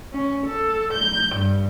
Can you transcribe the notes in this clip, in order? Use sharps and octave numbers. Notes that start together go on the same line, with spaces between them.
C#4
A4
G6
G2